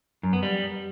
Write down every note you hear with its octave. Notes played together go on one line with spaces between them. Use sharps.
F#2
B3
G3